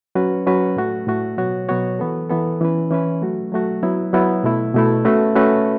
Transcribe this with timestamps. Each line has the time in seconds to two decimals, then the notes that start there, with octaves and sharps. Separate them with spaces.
0.15 F#3 C#4 F#4 B4
0.46 F#3 C#4 F#4 B4
0.76 A2 A3 F#4
1.07 A2 A3 F#4
1.37 B2 F#3 B3 F#4 C#5
1.69 B2 F#3 B3 F#4 C#5
1.99 E3 B3 A4
2.30 E3 B3 A4
2.61 E3 C#4 E4 B4
2.90 E3 C#4 E4 B4
3.21 F#3 A3 F#4
3.52 F#3 A3 F#4
3.82 F#3 B3 E4
4.13 F#3 B3 E4
4.44 B2 A3 E4
4.74 B2 A3 E4
5.05 A3 C#4 F#4 B4
5.36 A3 C#4 F#4 B4